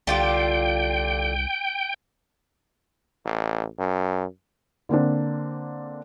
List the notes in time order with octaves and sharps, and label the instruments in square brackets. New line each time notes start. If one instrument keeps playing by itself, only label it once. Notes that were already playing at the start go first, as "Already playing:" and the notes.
[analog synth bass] C2 [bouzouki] D3 F4 G4 [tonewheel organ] G5
[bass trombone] A1
F#2
[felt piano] D3 A#3 C4 D4